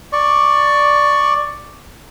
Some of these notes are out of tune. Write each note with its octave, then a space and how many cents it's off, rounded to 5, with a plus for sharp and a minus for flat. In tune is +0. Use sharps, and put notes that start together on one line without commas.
D5 +5 C#6 +5